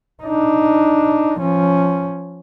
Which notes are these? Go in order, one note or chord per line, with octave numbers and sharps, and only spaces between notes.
D4 D#4
F3 C#4